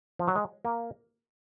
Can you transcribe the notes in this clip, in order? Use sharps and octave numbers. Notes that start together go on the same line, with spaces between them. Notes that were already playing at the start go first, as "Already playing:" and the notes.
F3
F#3
G#3
A#3